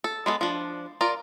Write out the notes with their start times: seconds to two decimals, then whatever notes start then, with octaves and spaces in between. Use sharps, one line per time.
0.04 A4
0.26 G#3 B3 G#4 A4
0.41 F3 D4
1.01 F4 A#4 D5